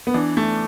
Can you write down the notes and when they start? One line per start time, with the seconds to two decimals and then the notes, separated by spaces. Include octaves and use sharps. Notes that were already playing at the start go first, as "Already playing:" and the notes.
0.07 B3
0.14 E3 D4
0.37 A3